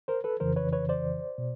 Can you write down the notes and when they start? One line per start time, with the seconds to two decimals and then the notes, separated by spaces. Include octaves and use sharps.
0.08 A#4 C5
0.24 A4 B4
0.40 F2 C#3 E3 A#4 C5
0.56 B4 C#5
0.73 B4 C#5
0.89 C5 D5
1.38 B2